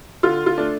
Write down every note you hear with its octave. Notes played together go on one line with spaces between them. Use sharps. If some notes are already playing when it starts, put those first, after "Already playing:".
D3 F4
F4
A3 D4